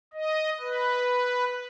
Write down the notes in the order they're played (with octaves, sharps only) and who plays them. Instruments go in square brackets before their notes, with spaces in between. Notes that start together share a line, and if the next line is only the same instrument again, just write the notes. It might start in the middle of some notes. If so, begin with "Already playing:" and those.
[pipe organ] D#5
B4